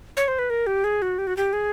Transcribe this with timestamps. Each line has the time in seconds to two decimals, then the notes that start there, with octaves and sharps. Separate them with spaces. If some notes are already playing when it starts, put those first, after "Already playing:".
0.17 C#5
0.28 C5
0.39 B4
0.50 A#4
0.67 G4
0.84 G#4
1.02 F#4
1.18 G4
1.27 F#4
1.37 G4
1.53 G#4